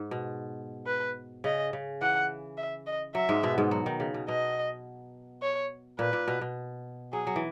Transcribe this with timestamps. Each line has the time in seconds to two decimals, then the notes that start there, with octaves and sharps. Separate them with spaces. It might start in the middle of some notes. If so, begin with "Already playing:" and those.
Already playing: G#2
0.11 B2
0.87 B4
1.44 C#3 D#5
1.73 C#3
2.01 E3 F#5
2.57 E5
2.87 D#5
3.15 F#3 E5
3.29 G#2 G#3
3.43 B2 B3
3.58 G#2 G#3
3.71 F#3
3.86 D#3
4.00 C#3
4.14 B2
4.28 B2 D#5
5.42 C#5
5.99 A#2 B4
6.13 A#2
6.28 B2
6.41 B2
7.13 F#3 G#4
7.27 F#3
7.36 E3